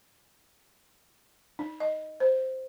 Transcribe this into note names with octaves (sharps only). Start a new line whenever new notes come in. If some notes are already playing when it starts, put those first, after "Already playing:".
D#4
D#5
C5